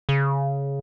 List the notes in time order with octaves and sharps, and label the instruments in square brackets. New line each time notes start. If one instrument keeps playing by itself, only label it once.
[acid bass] C#3